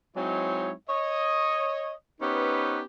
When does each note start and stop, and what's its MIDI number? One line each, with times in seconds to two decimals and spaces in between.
0.16 0.72 54
0.16 0.72 56
0.16 0.72 60
0.16 0.72 63
0.16 0.72 64
0.16 0.72 73
0.88 1.91 73
0.88 1.91 75
2.21 2.81 59
2.21 2.81 61
2.21 2.81 63
2.21 2.81 67
2.21 2.81 71
2.21 2.81 72